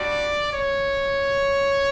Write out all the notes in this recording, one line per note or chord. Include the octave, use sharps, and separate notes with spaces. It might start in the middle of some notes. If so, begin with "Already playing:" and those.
Already playing: G3 D4 F#4 D5
C#5